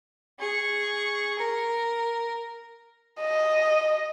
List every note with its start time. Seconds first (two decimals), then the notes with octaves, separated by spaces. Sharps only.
0.39 G#4 C#6
1.38 A#4
3.22 D#5